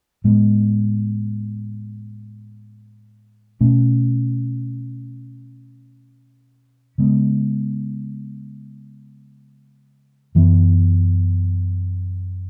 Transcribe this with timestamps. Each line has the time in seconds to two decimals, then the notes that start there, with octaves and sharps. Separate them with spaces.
0.24 A2 G#3 B3
3.61 B2 A3 C#4
6.98 C#3 G#3 B3
10.35 F#2 E3 B3